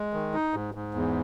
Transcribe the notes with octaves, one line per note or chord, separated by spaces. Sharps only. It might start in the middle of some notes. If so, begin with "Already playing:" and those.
Already playing: G#3
D#3
D#4
G#2
G#2
E2